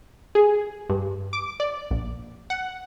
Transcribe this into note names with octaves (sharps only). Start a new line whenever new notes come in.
G#4
G2
D6
D5
A#1
F#5